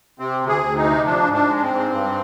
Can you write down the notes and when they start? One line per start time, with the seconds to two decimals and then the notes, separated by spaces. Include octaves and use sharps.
0.19 C3 C4
0.41 D2
0.48 G#4
0.63 D2
0.76 D#4
0.84 C3
1.05 F3 D4
1.26 G#2
1.33 D4
1.48 G#3
1.55 D4
1.62 C4
1.69 G#2
1.90 G2